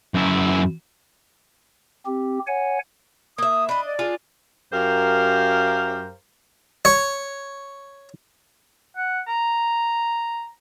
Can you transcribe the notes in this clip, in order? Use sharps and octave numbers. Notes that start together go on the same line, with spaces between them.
F#2 E4
C4 G4
C#5 F#5 G#5
A#3 E5 D#6
D4 D#5 B5
D5
D4 F4 G#4
F#2 G4 A#4 C5 F5
C#5
F#5
A#5